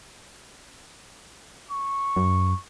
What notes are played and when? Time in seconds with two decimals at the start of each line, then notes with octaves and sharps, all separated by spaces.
1.71 C#6
2.16 F#2